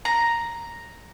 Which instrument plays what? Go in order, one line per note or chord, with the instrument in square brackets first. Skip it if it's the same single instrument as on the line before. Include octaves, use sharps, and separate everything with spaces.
[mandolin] A#5